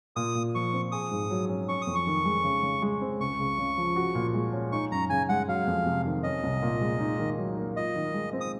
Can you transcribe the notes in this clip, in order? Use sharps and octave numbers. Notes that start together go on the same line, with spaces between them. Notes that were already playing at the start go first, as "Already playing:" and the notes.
A#2 D#6
A#2
F3 C#6
C4
G#4 D#6
G#2
F#3
C#4
C#4 C#6
D#6
F2
C#6
D#3
G#3
C#3
C#3
G#3
C4
C#2 C#6
C#2
C#3
F3
F#4
A#2
G#3
C#4
D#4 C#6
F#2 A#5
C#3 G#5
G#3 F#5
F#3 F5
F2
C3
D#3
C#4 D#5
C2
A#2
G#3
D#4
D#3
F#3
A#3
F4 D#5
D#3
G#3
C4
D#6